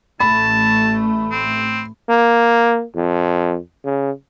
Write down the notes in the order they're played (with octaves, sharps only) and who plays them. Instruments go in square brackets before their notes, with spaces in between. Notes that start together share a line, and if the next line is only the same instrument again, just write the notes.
[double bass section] A1 A3 [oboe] A5 [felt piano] B5
[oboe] C4
[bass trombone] A#3
F2
C#3